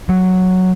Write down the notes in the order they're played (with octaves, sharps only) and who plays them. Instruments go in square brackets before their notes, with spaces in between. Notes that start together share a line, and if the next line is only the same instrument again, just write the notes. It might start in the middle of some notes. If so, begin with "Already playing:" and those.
[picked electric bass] F#3